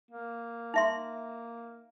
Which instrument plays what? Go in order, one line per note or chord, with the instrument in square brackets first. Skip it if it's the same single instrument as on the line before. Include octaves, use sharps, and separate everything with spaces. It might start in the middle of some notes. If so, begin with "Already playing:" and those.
[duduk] A#3
[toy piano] D#4 E5 C6